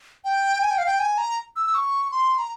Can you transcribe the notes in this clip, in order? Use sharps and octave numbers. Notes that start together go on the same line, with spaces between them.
G5
G#5
G5
F5
G5
G#5
A#5
E6
E6
C#6
C6
A#5